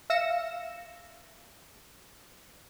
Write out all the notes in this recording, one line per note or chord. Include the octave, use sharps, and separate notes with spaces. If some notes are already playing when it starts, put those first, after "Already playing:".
E5 F5 E6 A#6 C#7 E7